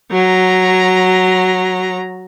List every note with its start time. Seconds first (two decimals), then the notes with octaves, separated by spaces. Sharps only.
0.12 F#3 A#5